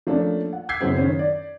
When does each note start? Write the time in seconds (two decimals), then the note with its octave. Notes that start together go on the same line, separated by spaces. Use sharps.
0.07 F3 A3 A#3 C#4 D4
0.53 F#5
0.69 D6 E6 G6 G#6 B6 C7
0.81 F#2 A2 C#3 B3 C4
0.98 D#3 C#4
1.19 D5